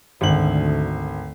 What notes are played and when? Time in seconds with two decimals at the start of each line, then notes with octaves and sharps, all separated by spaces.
0.21 G#1 D2 F#7